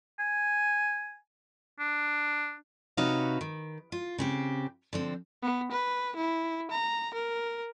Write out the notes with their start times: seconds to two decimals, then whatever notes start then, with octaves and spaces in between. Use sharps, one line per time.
0.20 G#5
1.80 D4
2.97 C3 D#4 F#4 B4 C#5 F5
3.41 D#3
3.92 F4
4.18 C#3 C4 G4
4.93 D3 F3 C4
5.43 B3
5.72 B4
6.16 E4
6.71 A#5
7.14 A#4